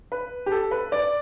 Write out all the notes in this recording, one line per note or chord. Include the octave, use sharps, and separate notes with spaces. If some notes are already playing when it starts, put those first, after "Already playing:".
B4
G4
A4
B4
D5